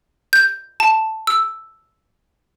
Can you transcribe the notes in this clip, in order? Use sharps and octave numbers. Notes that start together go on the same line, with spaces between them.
G6
A5
E6